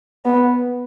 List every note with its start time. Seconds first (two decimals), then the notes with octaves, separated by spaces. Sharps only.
0.25 B3